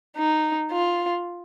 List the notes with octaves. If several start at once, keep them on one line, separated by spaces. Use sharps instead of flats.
D#4
F4